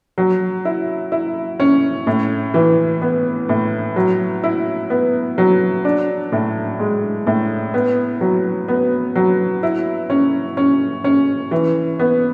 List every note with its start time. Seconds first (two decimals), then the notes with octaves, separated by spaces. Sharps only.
0.18 F#3
0.65 E4
1.12 E4
1.60 C#4
2.07 A2
2.54 E3
3.02 B3
3.49 A2
3.96 F#3
4.44 E4
4.90 B3
5.38 F#3
5.85 D4
6.32 A2
6.79 G#3
7.27 A2
7.74 B3
8.21 F#3
8.68 B3
9.15 F#3
9.63 E4
10.10 C#4
10.57 C#4
11.04 C#4
11.51 E3
11.99 B3